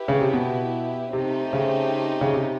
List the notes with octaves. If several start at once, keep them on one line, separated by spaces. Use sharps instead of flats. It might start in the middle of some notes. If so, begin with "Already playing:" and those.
Already playing: E4 G4 B4
C#3
C3
B2
C3 A3 C4 D#4 G4
C#3
C#3
C3